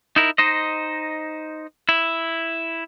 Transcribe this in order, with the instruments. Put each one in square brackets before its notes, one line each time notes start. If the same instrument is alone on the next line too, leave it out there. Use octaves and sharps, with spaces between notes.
[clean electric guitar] D#4 E4 A#4
D#4 C5 D#5
E4